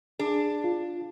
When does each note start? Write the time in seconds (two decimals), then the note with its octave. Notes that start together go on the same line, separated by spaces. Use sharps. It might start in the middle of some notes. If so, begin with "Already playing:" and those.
0.19 D4 G#4
0.64 F4